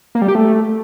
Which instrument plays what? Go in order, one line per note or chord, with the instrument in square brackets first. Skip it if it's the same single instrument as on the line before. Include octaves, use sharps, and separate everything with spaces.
[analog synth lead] A#3
G3
G4
A3